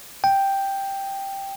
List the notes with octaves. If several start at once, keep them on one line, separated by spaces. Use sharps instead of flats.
G5